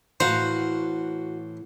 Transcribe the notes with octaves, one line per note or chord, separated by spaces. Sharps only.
A2 E3 F#4 C5 F5 F#5 A#5